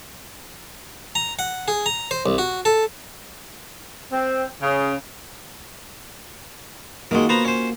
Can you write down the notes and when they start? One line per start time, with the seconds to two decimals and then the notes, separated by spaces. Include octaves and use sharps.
1.15 A#5
1.39 F#5
1.68 G#4
1.86 A#5
2.11 C5
2.26 C2
2.38 F#4
2.65 A4
4.12 C4
4.61 C#3
7.11 D#3 G#3 A#3 F4 F#4
7.29 B3 C5 A#5
7.45 C#4 C5